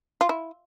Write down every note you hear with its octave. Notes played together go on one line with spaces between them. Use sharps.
F4
E4